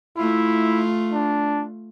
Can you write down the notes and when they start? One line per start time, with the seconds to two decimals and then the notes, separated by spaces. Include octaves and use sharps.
0.17 A3 E4 F4
1.13 D4